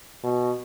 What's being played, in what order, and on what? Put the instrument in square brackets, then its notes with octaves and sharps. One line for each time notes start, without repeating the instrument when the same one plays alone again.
[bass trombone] B2